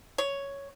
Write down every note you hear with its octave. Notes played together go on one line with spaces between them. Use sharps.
C#5